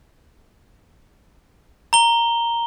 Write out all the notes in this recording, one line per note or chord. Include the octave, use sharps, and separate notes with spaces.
A#5 G7